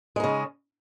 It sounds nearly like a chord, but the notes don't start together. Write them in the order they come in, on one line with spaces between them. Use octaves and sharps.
G#3 D#4 C#3